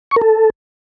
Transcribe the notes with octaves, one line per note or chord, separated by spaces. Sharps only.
C#6
A#4
A4